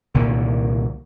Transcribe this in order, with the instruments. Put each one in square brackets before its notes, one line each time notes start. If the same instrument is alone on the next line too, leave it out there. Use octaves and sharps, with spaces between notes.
[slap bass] C2 A#2 D3 D#3